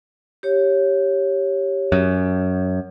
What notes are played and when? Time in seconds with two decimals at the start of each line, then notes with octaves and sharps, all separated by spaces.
0.43 G4 C#5
1.92 F#2